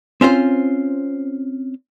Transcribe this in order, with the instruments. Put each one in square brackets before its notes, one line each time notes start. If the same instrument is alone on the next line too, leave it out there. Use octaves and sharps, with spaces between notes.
[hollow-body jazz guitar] C4 C#4 F4 C5